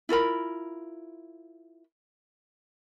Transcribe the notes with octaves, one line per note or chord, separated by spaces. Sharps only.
E4 F4 A#4 B5